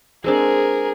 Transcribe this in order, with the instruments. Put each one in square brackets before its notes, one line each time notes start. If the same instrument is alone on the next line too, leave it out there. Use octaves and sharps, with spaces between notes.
[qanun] G#3 C4 D4 [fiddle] G#4 A#4